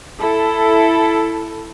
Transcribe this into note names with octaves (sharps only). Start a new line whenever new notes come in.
E4 A4